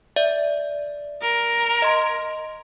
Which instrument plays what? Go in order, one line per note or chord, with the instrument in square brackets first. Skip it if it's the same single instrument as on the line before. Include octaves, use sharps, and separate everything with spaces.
[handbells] D5 E5
[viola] A#4
[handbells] D#5 C6